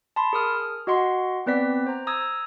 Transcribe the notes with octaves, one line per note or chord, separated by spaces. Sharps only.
A5 B5 C6
G#4 A#4 D#6 F6
F#4 D#5 F#5 C6
B3 C4 B4 D5 B6
C5 A#5
A#5 D#6 E6 G#6